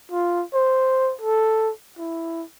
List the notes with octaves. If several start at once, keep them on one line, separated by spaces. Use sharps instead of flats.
F4
C5
A4
E4